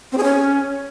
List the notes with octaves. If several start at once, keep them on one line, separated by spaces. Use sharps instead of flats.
C4
G#4
C#4